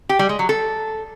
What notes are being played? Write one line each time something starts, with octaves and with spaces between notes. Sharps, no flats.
G4
G3
G#3
F#3
A4